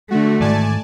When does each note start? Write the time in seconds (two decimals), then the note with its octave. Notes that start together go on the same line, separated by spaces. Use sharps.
0.10 D3 A3 F#4
0.40 G#2 D#3 E3 D5 G#5 A5